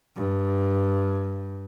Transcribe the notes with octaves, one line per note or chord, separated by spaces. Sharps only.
G2